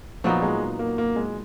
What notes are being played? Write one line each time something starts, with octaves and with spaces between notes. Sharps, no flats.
A#2 F3 F#3 B3 D#4
G#3
A#3
A#3
G#3